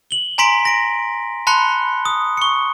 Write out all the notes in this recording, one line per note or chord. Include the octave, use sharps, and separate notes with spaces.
F#7 G7
G#5 A#5 C6 B6 D7
A#6 D7
A5 B5 C6 F#6 C#7 G7
D#6
C#6 C#7